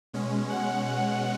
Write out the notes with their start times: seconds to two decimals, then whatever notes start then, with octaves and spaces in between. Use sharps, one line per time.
0.14 B2 G#3 C#4
0.50 F#5